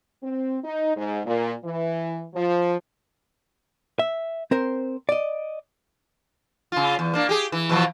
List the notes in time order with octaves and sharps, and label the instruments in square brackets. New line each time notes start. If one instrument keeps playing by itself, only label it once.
[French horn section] C4
D#4
G#2
A#2
E3
F3
[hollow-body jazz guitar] E5
C4 A#4 C5
D5 D#5
[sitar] C#3 F4
E2
A#3 D4
G4 G#4
E3
B2 E3 F3